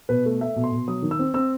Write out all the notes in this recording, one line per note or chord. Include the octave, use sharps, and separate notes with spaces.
B2 B4
A3
A3 E5
B2
C6
B2
F#3 D#6
D#3
E6
C4
C4 E6